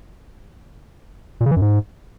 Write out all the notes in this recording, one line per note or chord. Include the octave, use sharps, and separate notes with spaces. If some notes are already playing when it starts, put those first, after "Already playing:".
A#2
C#3
E3
F#2
G#2